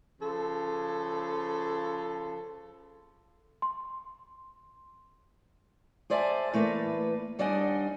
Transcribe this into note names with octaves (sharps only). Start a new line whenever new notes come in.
C#3 F3 A4
C6
G#4 C5 D5 E5 G#5 A5
E3 A3 A#3 B4
D#2 G3 D4 D#5 F#5 G#5